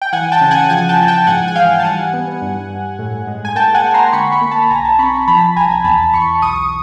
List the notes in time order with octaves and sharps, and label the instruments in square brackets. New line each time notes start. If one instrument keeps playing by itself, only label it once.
[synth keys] G5
E3 F#5 G#5
G5 A5
C#3
F#5 G#5
F3 F#5 G#5
G5 A5
F3
G5 A5
G#2 F#5 G#5
G#5
E3 F5 G5
A5
G3 F#5 G#5
B3
G2
G2
A2
G#3
G#5
A#3 G5 A5
F#5 G#5
A#3
A#5 C6
D3 B5 C#6
B5 C#6
A#3
A5 B5
B1 G#5 A#5
A5 B5
C4 B5 C#6
F3 A5 B5
C2 G#5 A#5
E2 A5 B5
E2 B5 C#6
B1 C#6 D#6